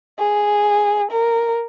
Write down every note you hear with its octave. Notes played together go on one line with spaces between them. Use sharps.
G#4
A#4